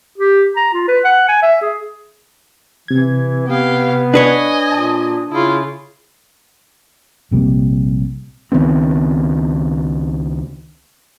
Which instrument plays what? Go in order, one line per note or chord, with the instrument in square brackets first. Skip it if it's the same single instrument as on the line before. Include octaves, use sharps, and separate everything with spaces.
[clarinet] G4
A#5
F4
B4
F#5
G#5
E5
G#4
[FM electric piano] C3 G#6 [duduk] E3
[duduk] B3 [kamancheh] G4 F5
[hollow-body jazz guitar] D4 B4 C#5 [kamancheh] D#5 G#5
[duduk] A#2 [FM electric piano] A5 D#6
[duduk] C#3 [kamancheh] E4 F4
[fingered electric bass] A#1 C3 G3 A#3
C#2 D#3 B3 C4